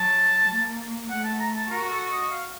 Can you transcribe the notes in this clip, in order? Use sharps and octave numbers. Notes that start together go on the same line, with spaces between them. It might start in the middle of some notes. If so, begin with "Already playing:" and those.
Already playing: F#3 A5
A#3
A3 F#5
A5
A#5
A5
F#4 A#4
A4
D#5
F5